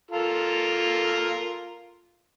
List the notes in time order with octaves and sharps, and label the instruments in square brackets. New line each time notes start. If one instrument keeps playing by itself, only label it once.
[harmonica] F4 A4 A#4